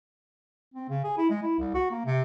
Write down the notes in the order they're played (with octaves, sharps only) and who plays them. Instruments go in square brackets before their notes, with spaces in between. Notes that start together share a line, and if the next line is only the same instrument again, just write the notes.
[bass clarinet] C4
C#3
G#4
E4
G#3
E4
C2
F#4
A#3
C3